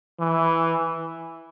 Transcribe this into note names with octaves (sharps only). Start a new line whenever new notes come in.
E3